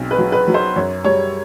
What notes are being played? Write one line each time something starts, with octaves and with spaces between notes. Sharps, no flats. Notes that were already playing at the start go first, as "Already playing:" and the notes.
Already playing: B1 C4
B4
F#3
B4
F#3
C5
F#2 C#5
G3 C#5